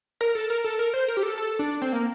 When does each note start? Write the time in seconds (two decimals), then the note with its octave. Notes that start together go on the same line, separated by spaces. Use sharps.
0.21 A#4
0.35 A4
0.50 A#4
0.64 A4
0.79 A#4
0.94 C5
1.08 A#4
1.17 G4
1.23 A4
1.38 A4
1.59 D4
1.82 C4
1.93 A#3